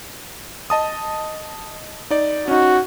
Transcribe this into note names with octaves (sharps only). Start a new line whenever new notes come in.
D#5 A5 D#6
D#4 D5
C#4 D#4 F#4